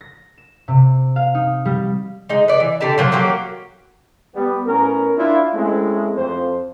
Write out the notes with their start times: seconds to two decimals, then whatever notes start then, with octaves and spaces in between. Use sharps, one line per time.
0.01 A#6
0.38 E7
0.68 C3
1.16 F5
1.35 D#4
1.65 G3
2.29 G#3 D#4
2.48 B4 D5
2.60 E3
2.81 D3 D4 G4 A5
2.98 F3 F#3 A#3
3.12 F#3 A#3 F#4 G4
4.35 G3 B3
4.66 A2 B3 C#4 A#4
5.17 D4 E4 F4
5.53 G#3 A3 C4 C#4 E4
6.16 F2 C5